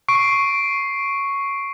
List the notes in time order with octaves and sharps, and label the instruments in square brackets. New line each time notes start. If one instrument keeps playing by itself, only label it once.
[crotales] C#6 C7 D7